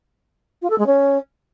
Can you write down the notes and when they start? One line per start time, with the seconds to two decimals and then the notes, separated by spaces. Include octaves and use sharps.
0.62 F4
0.70 A4
0.78 G#3
0.86 C#4